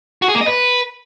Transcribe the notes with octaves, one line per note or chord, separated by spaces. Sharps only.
F#4
G#4
A#3
D#5
B4